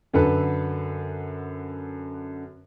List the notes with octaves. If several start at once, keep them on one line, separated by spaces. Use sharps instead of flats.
F#2 D3 A4 B4